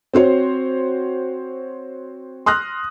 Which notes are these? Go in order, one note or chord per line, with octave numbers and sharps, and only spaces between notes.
C4 F#4 C5 C#5
C6 D#6 F6 F#6 A#6